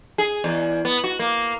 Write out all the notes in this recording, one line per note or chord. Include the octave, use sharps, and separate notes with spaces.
G#4
E2
B3
F#4
A#3